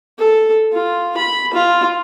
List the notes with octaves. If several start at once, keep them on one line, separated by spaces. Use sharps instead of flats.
A4
F4
B5
F4